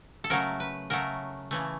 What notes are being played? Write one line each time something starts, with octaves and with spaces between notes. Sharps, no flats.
A4
C#3 F#3 A3 A#4
B4
C#3 F#3 A3 A#4
C#3 E3 A3